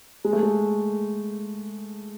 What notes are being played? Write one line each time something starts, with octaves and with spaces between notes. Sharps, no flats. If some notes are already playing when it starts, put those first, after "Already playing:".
G#3
A3
G#3